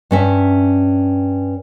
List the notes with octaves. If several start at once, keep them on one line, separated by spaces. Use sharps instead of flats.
G2 C#4 E5